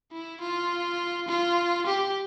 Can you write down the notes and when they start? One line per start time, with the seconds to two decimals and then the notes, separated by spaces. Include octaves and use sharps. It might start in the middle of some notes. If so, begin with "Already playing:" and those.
0.12 E4
0.41 F4
1.28 F4
1.87 G4